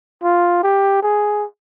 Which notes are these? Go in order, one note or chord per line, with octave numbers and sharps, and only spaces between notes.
F4
G4
G#4